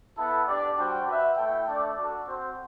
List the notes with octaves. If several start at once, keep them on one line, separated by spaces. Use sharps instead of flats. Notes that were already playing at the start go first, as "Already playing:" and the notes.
B3 E4 A4
D4 G4 D5
G3 D4 F#4 C5 G5
F#4 B4 E5
A3 E4 A4 E5 G5
A3 D4 A4 D5
D4 F#4 A4
C4 F#4 C5